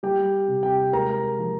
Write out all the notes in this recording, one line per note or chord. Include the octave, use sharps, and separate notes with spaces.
G3 G4 G5
C3
G4 G5
G#3 A#4 A#5
F3